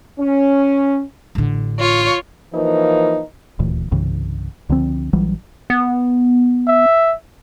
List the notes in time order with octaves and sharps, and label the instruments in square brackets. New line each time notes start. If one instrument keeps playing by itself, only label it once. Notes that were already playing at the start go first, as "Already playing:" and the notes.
[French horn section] C#4
[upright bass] A1 D3
[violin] F4 C#5
[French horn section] E3 F3 A#3 D#4
[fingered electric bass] D#1 D2 A#2 E3
C2 G2 C#3 E3
C#2 D3 F3 C4
A#1 E3 F#3 G3
[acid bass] B3
[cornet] E5